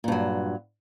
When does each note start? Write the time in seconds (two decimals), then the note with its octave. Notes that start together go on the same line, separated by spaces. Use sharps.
0.04 A#2
0.08 G2
0.12 F#3